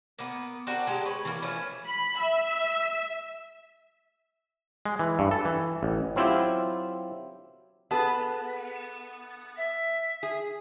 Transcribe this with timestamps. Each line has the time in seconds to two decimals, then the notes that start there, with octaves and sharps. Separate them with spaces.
0.19 A#3 B3
0.67 C4 D4 F#4 A#4
0.87 G#3 D4 G4
1.06 B4 C#5
1.25 E3 A#3
1.42 E3 F3 A3 C#4
1.87 B5
2.19 E5
4.86 G#3
4.99 E3
5.19 G2
5.31 A4
5.45 E3
5.83 A1
6.16 F#3 C4 E4 F4 G4
7.91 B3 G#4 A4 B4 A5 B5
9.58 E5
10.23 G#4